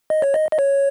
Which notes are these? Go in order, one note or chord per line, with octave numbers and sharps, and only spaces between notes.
D#5
C#5
D#5
D#5
C#5